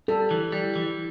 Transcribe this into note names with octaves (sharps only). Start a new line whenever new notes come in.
G3 A4
E3
G3
E3